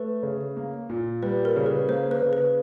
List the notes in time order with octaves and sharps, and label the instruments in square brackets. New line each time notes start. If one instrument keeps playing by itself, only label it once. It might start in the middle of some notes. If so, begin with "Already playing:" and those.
Already playing: [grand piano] A3 [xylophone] B4
[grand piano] C#3
A#3
A#2
[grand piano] G3 [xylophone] B4
[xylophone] A#4
[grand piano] C#3
[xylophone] B4
[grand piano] A#3 [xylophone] C5
[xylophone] B4
[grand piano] C#3
[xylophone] B4